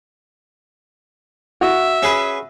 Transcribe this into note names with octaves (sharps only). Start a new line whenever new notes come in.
F#4 E5
C#4 G#4 B4